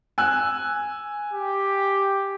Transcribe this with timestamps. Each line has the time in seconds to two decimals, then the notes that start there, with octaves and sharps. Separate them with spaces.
0.18 G#5 E6 F#6
1.33 G4